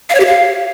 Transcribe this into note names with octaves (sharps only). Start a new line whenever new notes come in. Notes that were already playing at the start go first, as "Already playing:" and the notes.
F5
C#5
G4
F5